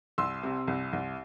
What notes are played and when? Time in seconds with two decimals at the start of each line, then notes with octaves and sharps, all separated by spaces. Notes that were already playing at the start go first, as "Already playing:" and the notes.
0.18 C2 C6 E6
0.43 C3
0.68 C2
0.93 C2